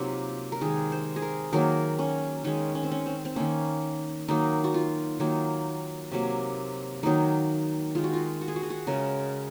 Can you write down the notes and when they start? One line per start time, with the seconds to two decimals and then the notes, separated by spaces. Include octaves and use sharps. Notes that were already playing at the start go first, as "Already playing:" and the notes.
Already playing: C3 F#3 A#3 D#4 F4
0.52 A#4
0.61 D#3 G#3 G#4
0.92 C5
1.16 G#4
1.22 A#4
1.52 D#3 F#3 A#3 A#4
1.99 C#4
2.44 D#3 G#3 C#4
2.75 C#4
2.83 C4
2.91 C#4
3.06 C4
3.25 C4
3.36 D#3 A#3 C#4
4.28 D#3 F#3 A#3 D#4
4.64 F#4
4.74 F4
5.20 D#3 F#3 A#3
6.12 C3 F#3 A#3
7.03 D#3 F#3 A#3 D#4
7.95 D#3 G#3 F4
8.04 F#4
8.13 F4
8.41 F#4
8.48 G#4
8.56 F#4
8.63 G#4
8.70 F#4
8.87 C#3 G#3 A#4